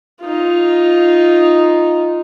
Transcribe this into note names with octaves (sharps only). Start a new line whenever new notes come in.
D#4 F4